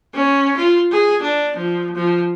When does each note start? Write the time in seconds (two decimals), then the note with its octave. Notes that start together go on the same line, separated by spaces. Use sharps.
0.14 C#4
0.57 F4
0.92 G#4
1.22 D4
1.57 F3
1.96 F3